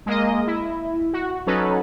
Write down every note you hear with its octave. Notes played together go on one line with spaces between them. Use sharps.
G#3 A#3 D#5
E4
F#4
F#3 C#4 D#4 A4 B4